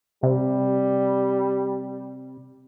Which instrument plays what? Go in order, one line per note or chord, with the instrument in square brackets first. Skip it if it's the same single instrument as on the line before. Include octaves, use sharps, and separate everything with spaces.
[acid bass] C3 [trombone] G3